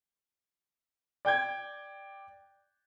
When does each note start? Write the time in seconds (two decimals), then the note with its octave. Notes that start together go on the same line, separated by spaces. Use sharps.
1.25 D5 G5 G6 G#6